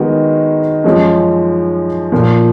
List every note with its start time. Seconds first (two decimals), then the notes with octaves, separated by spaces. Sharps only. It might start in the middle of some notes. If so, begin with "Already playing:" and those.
Already playing: D#3 G#3 B3 F#4
0.84 F#2 F3 G#3 C#4
2.12 A#2 F3 A#3